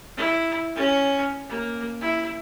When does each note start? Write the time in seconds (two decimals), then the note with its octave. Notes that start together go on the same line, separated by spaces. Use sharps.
0.17 E4
0.76 C#4
1.48 A#3
2.01 E4